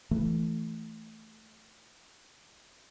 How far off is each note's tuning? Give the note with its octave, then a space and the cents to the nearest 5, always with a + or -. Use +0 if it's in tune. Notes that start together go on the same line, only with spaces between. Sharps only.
E3 +0 A3 +0